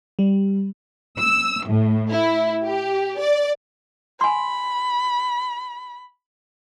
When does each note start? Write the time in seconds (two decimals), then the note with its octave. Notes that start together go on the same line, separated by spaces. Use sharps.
0.19 G3
1.19 E6
1.66 A2
2.10 E4
2.65 G4
3.18 D5
4.21 G#5 B5 C6